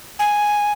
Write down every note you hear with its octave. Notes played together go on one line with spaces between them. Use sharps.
G#5